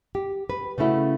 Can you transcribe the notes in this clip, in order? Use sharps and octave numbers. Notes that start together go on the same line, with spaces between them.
G4
B4
C#3 A3 C#4 E4 F#4